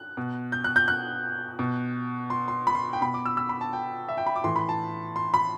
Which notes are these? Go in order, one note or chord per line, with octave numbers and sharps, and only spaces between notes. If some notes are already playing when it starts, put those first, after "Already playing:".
Already playing: F#6
B2
G6
F#6
G6
F#6
B2
C6
C6
B5
C6
G5
B2 B5
D6
E6
E6
B5
A5
G5
E5
G5
B5
D6
A2 E3 C6
B5
A5
C6
B5